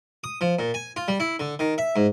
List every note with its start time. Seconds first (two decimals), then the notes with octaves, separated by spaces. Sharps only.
0.24 D#6
0.41 F3
0.59 A#2
0.74 G#5
0.96 F4
1.08 G3
1.20 E4
1.40 D3
1.59 D#3
1.78 E5
1.96 G#2